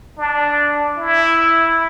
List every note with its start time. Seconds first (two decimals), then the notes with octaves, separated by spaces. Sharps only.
0.18 D4
0.98 E4